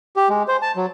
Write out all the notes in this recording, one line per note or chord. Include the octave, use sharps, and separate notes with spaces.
G4
G#3
C5
A5
F#3